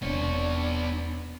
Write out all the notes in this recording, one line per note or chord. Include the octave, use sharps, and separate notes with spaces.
E1 C3 B3 D4 C#5